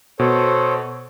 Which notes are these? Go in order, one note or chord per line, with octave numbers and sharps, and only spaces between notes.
B2 A4 C5 C#5